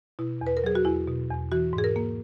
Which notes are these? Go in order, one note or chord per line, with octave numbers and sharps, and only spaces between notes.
B2 E4
E2
B4
A#4
F#3 G#4
F#4
E2 E4
B2
E2
E3 F#4
G#2
G#4
A#4
A#3